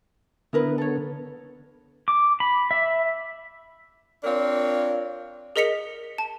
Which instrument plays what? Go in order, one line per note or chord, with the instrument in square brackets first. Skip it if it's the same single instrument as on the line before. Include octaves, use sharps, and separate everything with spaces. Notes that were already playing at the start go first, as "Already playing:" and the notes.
[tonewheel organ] D3 B3 [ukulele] E4 A#4 B4
[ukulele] A4 C#5
[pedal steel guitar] D6
B5
E5
[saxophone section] C4 D4 F4 A#4 C#5
[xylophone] G#4 A#4 D#5 B6 C#7 F7
A5